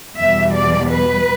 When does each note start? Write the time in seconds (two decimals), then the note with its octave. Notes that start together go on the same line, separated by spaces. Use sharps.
0.18 E2 B2 G3 E5
0.55 D5
0.91 B4